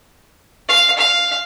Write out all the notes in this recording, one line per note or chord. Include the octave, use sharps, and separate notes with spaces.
F5
F5